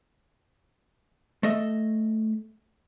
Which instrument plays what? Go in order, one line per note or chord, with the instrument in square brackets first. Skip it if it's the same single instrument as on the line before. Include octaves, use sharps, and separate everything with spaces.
[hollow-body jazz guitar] A3 D#5 E5